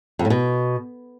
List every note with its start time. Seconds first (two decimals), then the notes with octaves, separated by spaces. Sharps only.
0.19 F2
0.25 A2
0.30 B2